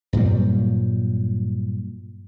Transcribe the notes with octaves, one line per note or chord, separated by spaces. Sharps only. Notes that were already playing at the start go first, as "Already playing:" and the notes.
G2 A#2 F#3 G3